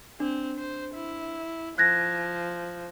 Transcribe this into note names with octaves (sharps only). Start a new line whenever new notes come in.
C4 D4
C5
E4
F3 F#6 G#6 A#6